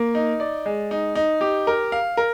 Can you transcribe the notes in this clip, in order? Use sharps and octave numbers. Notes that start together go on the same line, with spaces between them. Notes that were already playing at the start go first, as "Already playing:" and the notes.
Already playing: A#3
D#4
D5
G#3
D#4
D#4
G4
A#4
F5
A#4